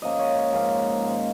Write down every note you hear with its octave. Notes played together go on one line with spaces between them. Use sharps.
G#2 F3 A#3 C#4 D#5
C#5
C#5
G#2 F3 A#3 C#4
G#2 D#3 G#3